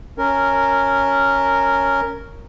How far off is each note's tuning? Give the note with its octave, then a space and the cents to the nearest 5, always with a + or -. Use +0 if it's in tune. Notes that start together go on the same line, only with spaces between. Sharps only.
C#4 +0 A#4 -10